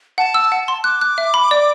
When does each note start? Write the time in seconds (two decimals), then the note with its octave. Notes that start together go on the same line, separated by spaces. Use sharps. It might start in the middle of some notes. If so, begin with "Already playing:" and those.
0.18 F#5 A5
0.34 E6
0.52 F#5
0.68 C6
0.84 D6 F#6
1.01 F#6
1.18 E5
1.34 B5
1.51 D5